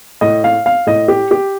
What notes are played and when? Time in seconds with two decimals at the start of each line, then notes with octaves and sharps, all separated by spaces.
0.21 A2 D#5
0.44 F5
0.66 F5
0.87 A2 D#5
1.08 G4
1.31 G4